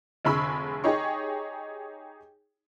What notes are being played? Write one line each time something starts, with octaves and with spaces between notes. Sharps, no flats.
F1 D3 G#4 B5 C#6 E6
D#4 G4 G#4 C#5 D#5 C#6